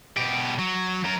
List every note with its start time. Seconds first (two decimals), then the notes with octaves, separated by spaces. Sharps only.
0.17 B2 G4
0.58 F#3
1.04 F#3 A#4